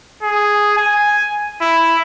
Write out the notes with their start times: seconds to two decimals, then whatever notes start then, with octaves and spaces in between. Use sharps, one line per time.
0.23 G#4
0.77 G#5
1.62 E4